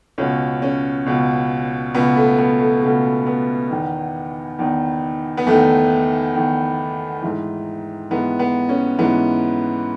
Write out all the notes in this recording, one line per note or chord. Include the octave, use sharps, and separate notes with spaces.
C#2 B2 C#4
C#4
C#2 B2
C#2 B2 B3
A3
B3
A3
C#2 B2 A3
B3
E2 D#3
E2 D#3
B3
E2 D#3 A3
E2 D#3
G#2 E3
G#2 E3 B3
B3
C#4
G#2 E3 B3